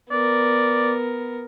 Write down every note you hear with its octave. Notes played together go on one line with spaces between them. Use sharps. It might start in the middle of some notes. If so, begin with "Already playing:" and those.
B3 A#4 D5